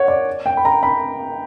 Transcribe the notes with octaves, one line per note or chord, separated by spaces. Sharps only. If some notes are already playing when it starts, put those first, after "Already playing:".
Already playing: C#5 F#5
D5
G5
B5
A#5
B5